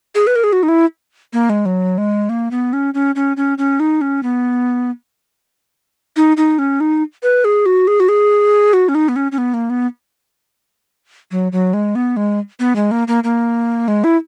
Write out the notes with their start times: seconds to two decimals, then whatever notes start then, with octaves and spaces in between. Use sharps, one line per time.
0.15 G#4
0.27 B4
0.36 A#4
0.44 G#4
0.52 F#4
0.63 D#4
0.68 E4
1.33 A#3
1.49 G#3
1.65 F#3
1.98 G#3
2.29 A#3
2.51 B3
2.73 C#4
2.94 C#4
3.15 C#4
3.37 C#4
3.58 C#4
3.80 D#4
4.01 C#4
4.23 B3
6.16 D#4
6.37 D#4
6.59 C#4
6.80 D#4
7.23 B4
7.44 G#4
7.66 F#4
7.87 G#4
8.00 F#4
8.08 G#4
8.73 F#4
8.88 C#4
8.95 D#4
9.08 B3
9.16 C#4
9.32 C#4
9.38 B3
9.54 A#3
9.70 B3
11.31 F#3
11.52 F#3
11.73 G#3
11.95 B3
12.16 G#3
12.59 B3
12.76 G#3
12.91 A#3
13.08 A#3
13.24 A#3
13.88 G#3
14.04 E4